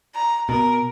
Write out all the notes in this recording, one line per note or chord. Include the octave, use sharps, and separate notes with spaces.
A#5
B2 A#4